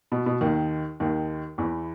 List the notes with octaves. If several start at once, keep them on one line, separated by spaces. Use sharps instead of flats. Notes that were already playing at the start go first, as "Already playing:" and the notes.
B2
B2
D#2 D#3
D#2 D#3
E2 E3